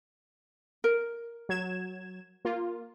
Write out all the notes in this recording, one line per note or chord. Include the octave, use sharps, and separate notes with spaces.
A#4
F#3 G#6 E7
A#3 F4